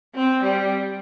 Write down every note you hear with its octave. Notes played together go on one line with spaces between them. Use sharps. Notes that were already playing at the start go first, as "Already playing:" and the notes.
C4
G3